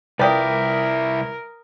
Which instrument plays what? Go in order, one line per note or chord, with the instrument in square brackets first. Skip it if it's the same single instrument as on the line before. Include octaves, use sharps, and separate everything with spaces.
[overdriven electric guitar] C2 E4 [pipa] F3 G4 [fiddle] A#4 [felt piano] B4 D5 D#6